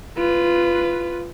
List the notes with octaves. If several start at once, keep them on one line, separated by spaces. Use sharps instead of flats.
F4 B4